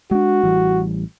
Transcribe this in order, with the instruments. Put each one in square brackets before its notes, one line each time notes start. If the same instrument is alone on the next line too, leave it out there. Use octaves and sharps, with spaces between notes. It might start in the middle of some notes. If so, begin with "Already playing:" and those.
[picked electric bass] G#3 D4 [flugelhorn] F#4
[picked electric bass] A1 E3 G3